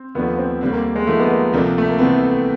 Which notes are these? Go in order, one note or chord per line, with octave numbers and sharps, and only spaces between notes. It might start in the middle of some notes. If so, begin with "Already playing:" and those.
Already playing: C4
D#2 D3 F3 A3 B3 D4
C4
D#2 D3 G3 C4
A#3
G#3
D3 F3 A3 A#3 D#4
B3
A#3
D2 C3 F3 A3 A#3 D4
A3
A#3
C2 C3 E3 A3 B3 C4